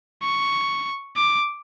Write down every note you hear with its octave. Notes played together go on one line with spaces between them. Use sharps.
C#6
D6